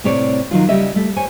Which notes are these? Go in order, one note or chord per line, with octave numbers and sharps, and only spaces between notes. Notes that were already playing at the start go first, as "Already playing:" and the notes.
A2 C3 C4 C#5 D5
D#3 F#3 F4
C#3 G3 C#4 D#5 E5
A3
C5 C#5 G#5